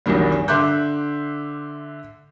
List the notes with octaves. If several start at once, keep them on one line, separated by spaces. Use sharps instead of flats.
B1 E2 G2 B2 D#3 G3
D3 E5 C6 D6 F#6 G6